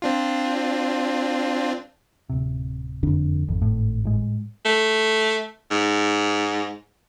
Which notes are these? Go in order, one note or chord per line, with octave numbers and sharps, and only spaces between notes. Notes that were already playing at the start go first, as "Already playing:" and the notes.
C4 D4 F4
D1 C3
F#1 F2 D3 D4
G#1 F2
A2
A2 G#3
A3
G#2